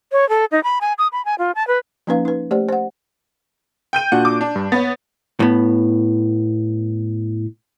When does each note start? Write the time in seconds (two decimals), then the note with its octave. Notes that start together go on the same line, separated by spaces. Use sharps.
0.12 C#5
0.29 A4
0.52 D#4
0.64 B5
0.81 G#5
0.98 D#6
1.12 B5
1.25 G#5
1.39 F4
1.55 A5
1.68 B4
2.07 F3 A#3 C#4 D#4 B4 F5
2.25 D#4 B4
2.51 A3 G4 C5 D5
2.69 C5 F#5
3.93 G5 G6 D#7
4.12 A#2 D4 F#4 F#5
4.25 D6
4.41 D4
4.56 G2
4.72 B3 C#5 B5 A6
5.40 A2 B3